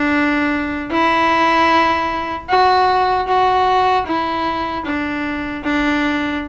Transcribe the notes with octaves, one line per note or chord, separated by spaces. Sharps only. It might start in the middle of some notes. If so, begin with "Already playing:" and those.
Already playing: D4
E4
F#4
F#4
E4
D4
D4